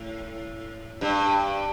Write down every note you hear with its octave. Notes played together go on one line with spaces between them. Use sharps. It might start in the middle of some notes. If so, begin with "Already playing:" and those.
Already playing: A2
G2